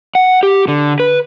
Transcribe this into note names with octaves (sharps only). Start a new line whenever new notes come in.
F#5
G4
D3
B4